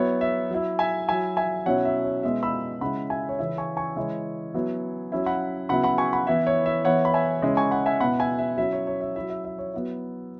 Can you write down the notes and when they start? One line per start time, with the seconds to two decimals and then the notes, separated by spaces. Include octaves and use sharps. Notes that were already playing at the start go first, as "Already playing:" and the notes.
Already playing: F#3 B3 E4 C#5
0.21 E5
0.50 F#3 E4
0.79 E5 G#5
1.08 F#3 E4 E5 G#5
1.37 E5 G#5
1.66 B2 F#3 C#4 E4 C#5 F#5
1.85 E5
2.04 C#5
2.23 B2 G#3 B3 E4 E5
2.43 B5 E6
2.81 C#3 G#3 E4 F#5 B5
3.10 E5 G#5
3.29 C#5
3.39 C#3 E3 C#4 E4 E5
3.58 G#5 C#6
3.77 G#5 C#6
3.96 C#3 E3 G#3 C#4 E4
4.54 F#3 B3 E4
5.12 F#3 C#4 E4
5.26 F#5 B5
5.69 C#3 F#3 B3 E4 F#5 B5
5.83 F#5 B5
5.98 G#5 C#6
6.13 F#5 B5
6.27 E3 B3 E4 E5
6.47 C#5
6.66 E5
6.85 E3 B3 E4 C#5 F#5
7.05 B5
7.14 E5 G#5
7.42 C#3 G#3 C#4 E4
7.57 G#5 C#6
7.71 F#5 B5
7.86 E5 G#5
8.00 B2 B3 E4 F#5 B5
8.20 E5 G#5
8.39 E5
8.57 F#3 C#4 E4 E5
8.72 C#5
8.87 C#5
9.01 E5
9.16 F#3 E4 E5
9.30 E5
9.45 E5
9.59 C#5
9.74 F#3 B3 E4